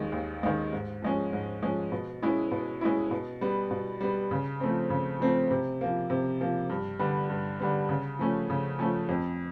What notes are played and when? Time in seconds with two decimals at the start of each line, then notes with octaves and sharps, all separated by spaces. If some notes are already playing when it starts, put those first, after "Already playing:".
Already playing: D#2 D#3 G#3
0.12 D#2
0.43 D#3 G#3
0.73 G#2
1.02 F3 G#3 C#4
1.33 G#2
1.63 F3 G#3 C#4
1.92 B2
2.22 G#3 C#4 E4
2.51 B2
2.81 G#3 C#4 E4
3.11 B2
3.41 G3 B3
3.71 B2
4.01 G3 B3
4.31 C#3
4.60 F3 A3 C4
4.90 C#3
5.20 F3 A3 C4
5.51 C3
5.81 F3 A#3
6.10 C3
6.41 F3 A#3
6.70 G2
6.99 D3 G3 B3
7.30 G2
7.59 D3 G3 B3
7.89 C#3
8.19 F3 A3 C#4
8.50 C#3
8.79 F3 A3 C#4
9.09 F2